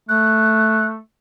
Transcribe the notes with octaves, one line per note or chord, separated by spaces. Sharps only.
A3 F#6